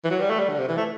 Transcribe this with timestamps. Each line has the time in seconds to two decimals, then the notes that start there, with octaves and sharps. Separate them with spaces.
0.04 E3
0.11 F#3
0.20 G3
0.30 A3
0.39 G3
0.49 D3
0.59 C3
0.68 E3
0.77 A3